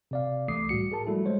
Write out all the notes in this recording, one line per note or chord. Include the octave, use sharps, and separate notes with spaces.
C3 D5 F5
C2 E3 A3 D6 D#6 C7
A2 G3 F#4 C#7
G#4 A#4 A5
F3 G3 A3 E4 F#4 A4
G3 G#3 C5 C#5